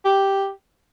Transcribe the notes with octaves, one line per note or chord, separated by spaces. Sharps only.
G4